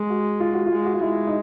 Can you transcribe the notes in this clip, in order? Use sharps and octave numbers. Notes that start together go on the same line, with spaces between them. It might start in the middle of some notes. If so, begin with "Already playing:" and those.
Already playing: G#3
F#4
F4
F#4
F4
G#3
F#4
F4
G#3 E4
D#4